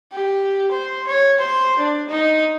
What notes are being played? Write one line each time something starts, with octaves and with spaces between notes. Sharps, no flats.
G4
C5
C#5
C5
D4
D#4